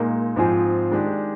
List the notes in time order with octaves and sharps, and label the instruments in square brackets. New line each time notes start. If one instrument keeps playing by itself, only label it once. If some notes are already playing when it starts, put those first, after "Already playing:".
Already playing: [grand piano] A#2 G#3 D#4 [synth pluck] A#3
[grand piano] G#2 F3 C4 F4 G#4
D#3 G#3 D4 G4